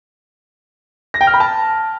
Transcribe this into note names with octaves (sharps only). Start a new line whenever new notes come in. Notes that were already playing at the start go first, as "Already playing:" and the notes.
A#6
G5
F6
B5
A5